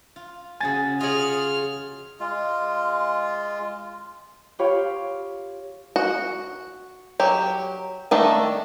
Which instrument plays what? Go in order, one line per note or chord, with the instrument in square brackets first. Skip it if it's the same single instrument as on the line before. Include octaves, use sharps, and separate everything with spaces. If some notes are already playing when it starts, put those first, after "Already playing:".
[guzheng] F4
[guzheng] C#3 C#4 F#4 [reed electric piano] G#5 A6
[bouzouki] F4 G#4 [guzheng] C#5 D#5 [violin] F6
[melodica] G#3 F4
[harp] F4 G4 C#5 F5 B5
[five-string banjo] F#4
F#3 G4
D#3 A3 D4